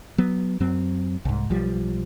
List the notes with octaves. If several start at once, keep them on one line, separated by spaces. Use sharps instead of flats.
F#3 B3
F#2 F#3 C4
C2 G#2
B1 F3 G3